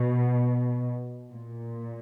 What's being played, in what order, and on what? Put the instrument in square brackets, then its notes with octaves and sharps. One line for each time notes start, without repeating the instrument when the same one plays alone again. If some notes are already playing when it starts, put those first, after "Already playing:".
Already playing: [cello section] B2
A#2